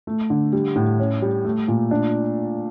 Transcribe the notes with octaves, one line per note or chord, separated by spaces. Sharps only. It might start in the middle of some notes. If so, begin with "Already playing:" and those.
A3
D3
G3
A2
C#4
G3
A3
A#2
D4